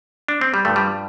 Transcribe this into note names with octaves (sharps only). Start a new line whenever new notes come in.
D4
C4
G3
G2 F3 A3
G3